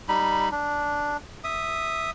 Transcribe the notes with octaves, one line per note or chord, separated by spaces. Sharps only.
G3 D#4 B5
D4
E5 D#6